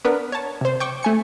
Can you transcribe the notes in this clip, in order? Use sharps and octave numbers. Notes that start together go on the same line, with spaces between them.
B3 D4 A#4 B4
C#5 A5
C3 C5
G5 C#6 D6
A3 G#5 C#7